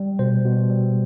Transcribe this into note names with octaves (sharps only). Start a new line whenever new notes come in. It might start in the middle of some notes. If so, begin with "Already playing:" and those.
Already playing: G3
B2 C5
B2
G3